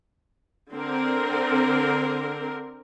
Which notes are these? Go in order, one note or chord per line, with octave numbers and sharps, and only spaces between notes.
D3 C4 A#4